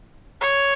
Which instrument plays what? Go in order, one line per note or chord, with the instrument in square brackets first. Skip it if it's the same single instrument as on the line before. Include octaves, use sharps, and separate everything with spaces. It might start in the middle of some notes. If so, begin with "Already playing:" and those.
[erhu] C#5